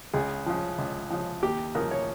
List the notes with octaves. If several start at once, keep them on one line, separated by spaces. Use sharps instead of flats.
C#2 G#4
C#3 F3
C#2
C#3 F3
D#2 G4
C#3 F3 A#4
C#5